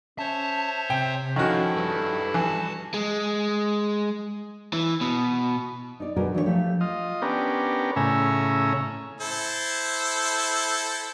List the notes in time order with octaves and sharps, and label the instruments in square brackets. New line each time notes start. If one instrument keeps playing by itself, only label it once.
[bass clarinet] C#4 [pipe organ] C5 C#5 E5 [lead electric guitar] A5
[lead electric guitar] C3 [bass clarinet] C4 [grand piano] G5
[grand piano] D#3 C#4 F#4 [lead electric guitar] F3 [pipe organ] E4 [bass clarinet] A4
[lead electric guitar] G3 B4
[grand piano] E3 [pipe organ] F#4 A5
[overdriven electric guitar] G#3
E3
B2
[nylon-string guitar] D#4 D5
B2 D3 G3 F#4 G#4 A#4
E3 D4 E4 C#5
F3 A3 G4 A4
[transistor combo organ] F4 D#5
B3 C#4 D4 G4 A#4
A2 C#3 C#4 E5 G#5 A#5
[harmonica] E4 A4 C5